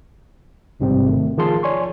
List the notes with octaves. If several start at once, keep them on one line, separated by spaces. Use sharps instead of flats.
A1 G#2 C3 G3 C4
D#3 A3
D#3 F3 F4 G#4 A5 C6
C#5 D5 G#5 C6 C#6